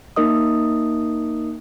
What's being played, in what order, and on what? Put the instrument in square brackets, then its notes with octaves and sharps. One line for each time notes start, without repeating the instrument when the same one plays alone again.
[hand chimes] A#3 D#4 A#4 D#5 D#6